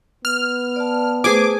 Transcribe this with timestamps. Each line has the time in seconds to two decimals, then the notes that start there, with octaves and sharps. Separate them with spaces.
0.25 B3 F6
0.76 D5 A5
1.24 A3 G#4 B4 C5 G#5 D6